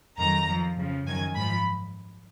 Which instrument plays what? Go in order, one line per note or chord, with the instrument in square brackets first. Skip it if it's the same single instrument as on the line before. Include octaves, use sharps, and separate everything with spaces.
[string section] F2 D#3 F#3 A#5
F2 F3
F2 C#3 F3
F#2 D#3 F#3 G#5
G#2 F3 B5